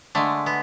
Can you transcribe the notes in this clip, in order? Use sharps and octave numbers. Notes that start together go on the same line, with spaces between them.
D3 G#3 A3
B3